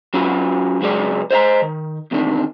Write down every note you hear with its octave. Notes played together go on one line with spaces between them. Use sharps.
F#3 C#4 F4 F#4 B4
C#2 F#3 G#3 B4 D5
C5 D#5 E5 A#5
D#3
E2 C3 D#3 D4